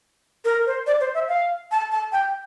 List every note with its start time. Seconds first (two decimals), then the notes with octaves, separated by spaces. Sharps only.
0.45 A#4
0.66 C5
0.87 D5
1.00 C5
1.14 E5
1.29 F5
1.71 A5
1.92 A5
2.12 G5